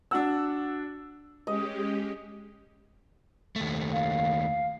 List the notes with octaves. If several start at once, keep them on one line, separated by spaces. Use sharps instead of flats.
D4 F#4 F#5 E6
G#3 C#4 G4 D#5
D#2 A3
F5